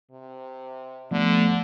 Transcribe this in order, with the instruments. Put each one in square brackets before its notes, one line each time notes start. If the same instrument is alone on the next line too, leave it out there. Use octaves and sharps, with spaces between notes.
[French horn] C3
[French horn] D3 [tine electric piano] F3 A3 B3